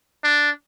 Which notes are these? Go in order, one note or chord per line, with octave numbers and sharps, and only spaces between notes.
D4